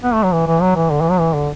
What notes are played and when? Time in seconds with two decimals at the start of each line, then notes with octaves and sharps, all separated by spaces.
0.03 B3
0.14 A3
0.23 F#3
0.33 E3
0.47 E3
0.61 F#3
0.76 E3
0.91 D3
1.01 E3
1.10 F#3
1.19 E3
1.34 D3